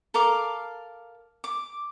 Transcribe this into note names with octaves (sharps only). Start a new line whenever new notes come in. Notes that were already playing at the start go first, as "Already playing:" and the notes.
A4 A#4 F5 D6
D6